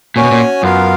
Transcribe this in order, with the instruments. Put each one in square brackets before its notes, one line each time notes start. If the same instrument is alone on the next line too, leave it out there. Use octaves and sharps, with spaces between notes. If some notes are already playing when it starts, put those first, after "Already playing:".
[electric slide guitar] A#2 [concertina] C#4 F#4 C#5 G#5
[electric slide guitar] B2
A#2
[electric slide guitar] F#2 [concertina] B3 F4 A#4 F5